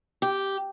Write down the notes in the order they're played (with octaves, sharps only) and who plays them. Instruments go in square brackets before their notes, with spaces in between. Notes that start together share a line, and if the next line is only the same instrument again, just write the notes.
[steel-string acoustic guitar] G4